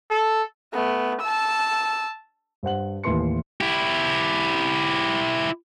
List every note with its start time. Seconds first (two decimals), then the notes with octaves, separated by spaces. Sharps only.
0.10 A4
0.74 A3 B3
1.21 A5 E6
2.63 G2 C5 F#5 F#7
3.04 D#2 A2 E3 B4 C6 C#7
3.61 E4 G4